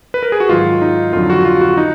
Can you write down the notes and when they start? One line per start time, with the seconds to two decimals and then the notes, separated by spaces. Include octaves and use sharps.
0.14 B4
0.23 A#4
0.32 G#4
0.40 F#4
0.49 G#2 D#3 F#3 F4
0.82 D#4
1.13 F2 D3 F#3 F4
1.30 F#4
1.45 F4
1.61 F#4
1.77 D#4